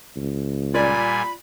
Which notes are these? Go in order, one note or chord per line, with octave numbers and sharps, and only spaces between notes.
C#2
A#2 G3 F4 D5 G#5 B5